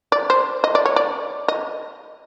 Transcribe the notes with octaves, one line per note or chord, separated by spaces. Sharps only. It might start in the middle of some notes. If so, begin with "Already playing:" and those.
D5
C5
D#5
D5
C#5
D5
D#5